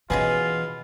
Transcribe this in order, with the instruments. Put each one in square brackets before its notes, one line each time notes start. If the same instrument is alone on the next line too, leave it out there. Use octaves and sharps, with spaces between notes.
[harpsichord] B2 [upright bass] E3 [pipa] G#3 C#4 G#4 [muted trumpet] F4